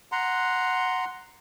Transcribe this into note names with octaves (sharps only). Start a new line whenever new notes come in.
F#5 A#5 C6